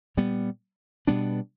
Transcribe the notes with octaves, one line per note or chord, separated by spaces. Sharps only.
A#2 G3 B3
B2 G3 B3 D4